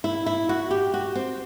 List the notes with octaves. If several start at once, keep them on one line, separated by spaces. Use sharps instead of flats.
E4
E4
F#4
G4
F#4
C4